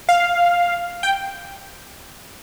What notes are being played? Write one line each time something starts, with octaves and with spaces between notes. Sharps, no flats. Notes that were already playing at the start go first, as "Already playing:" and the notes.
F5
G5